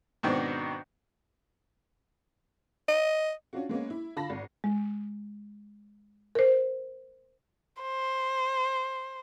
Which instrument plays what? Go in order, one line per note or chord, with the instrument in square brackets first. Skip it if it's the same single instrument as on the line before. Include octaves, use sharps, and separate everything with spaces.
[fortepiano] G#2 B2 D#3 B3 C4 D4
[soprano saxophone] D#5
[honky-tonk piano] C#4 D4 F4 F#4
G#3 A#3 B3 C#4
E4
D3 F4 A5 B5 A#6
G#1
[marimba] G#3
A#4 C5
[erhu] C5